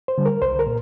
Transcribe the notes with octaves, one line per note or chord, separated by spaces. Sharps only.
C5
D3 G3
A#4
C2 C5
A#4
A#2